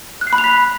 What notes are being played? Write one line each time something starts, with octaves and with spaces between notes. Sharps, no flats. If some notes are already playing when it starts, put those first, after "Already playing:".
F#6
C7
B5
F7
B6